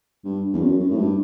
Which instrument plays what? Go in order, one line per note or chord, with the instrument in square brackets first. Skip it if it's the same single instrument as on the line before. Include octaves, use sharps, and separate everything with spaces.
[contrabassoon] G2
E2
F#2
F#2
A2
G2